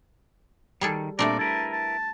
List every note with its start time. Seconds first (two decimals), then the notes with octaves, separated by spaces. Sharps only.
0.81 D#3 G3 G#4 A4
1.19 A#2 G3 A3 C4 D4 A#4 D5
1.39 E4 A#4 B4 A5
1.72 A5